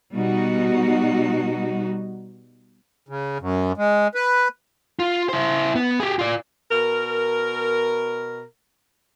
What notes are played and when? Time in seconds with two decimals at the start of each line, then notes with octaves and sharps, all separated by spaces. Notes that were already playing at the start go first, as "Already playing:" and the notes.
0.14 B2 G3 D#4 F#4
3.09 C#3
3.40 F#2
3.77 G#3
4.15 B4
4.99 F4
5.29 E4 C5
5.75 B3
6.00 G4 G#4
6.19 F4 D5
6.70 B2 A#4